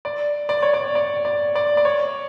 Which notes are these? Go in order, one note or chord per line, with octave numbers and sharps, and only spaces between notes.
D5
D5
C#5
D5
D5
D5
D5
D5
C#5